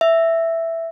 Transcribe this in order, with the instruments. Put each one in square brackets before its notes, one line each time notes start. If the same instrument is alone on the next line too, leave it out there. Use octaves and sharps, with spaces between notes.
[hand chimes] E5